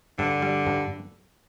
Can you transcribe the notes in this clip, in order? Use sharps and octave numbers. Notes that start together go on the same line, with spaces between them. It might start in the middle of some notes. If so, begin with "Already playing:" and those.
G2 D3
G3
G2